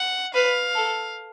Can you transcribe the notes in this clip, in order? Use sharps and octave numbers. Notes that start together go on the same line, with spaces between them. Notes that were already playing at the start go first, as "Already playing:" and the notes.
Already playing: F#5
B4 F5
A4